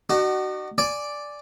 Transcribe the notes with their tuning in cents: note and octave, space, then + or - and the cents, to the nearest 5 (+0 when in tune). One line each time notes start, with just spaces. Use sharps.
D#4 -45 F#4 +25
D5 +0 G#5 +0 D6 +0